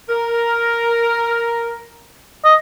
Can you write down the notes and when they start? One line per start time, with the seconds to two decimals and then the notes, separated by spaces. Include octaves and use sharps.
0.09 A#4
2.45 D#5